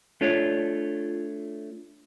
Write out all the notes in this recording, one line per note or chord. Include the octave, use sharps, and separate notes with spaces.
A3 D4 F4 C#5